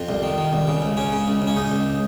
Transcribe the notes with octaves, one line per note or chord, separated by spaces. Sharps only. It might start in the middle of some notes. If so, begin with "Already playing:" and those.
Already playing: F2 F4
C2
D#3
D#3
C2
C#3
C#2
C#3 C#4
C#3
C#2
C#2
C#4
C#2 D#4
C#2